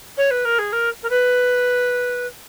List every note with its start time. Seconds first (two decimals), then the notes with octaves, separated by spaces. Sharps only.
0.17 C#5
0.30 B4
0.45 A#4
0.58 G#4
0.72 A#4
1.03 A#4
1.09 B4